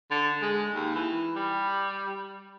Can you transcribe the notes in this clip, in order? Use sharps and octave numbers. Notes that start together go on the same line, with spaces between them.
D3
G#3
D#2
E3
G3